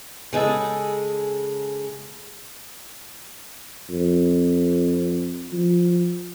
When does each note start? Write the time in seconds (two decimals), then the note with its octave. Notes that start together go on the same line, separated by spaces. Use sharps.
0.33 C#3 G#3 G#4 A4
3.90 F2
5.52 F3